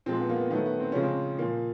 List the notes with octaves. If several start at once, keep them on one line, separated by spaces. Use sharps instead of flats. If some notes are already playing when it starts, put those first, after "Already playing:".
A#2 F3 G#3 C4
B3
A#3
B3
D#3 F#3 A3 B3
B3
C4
C#3 F3 G#3 C#4
C4
A#2 F3 A#3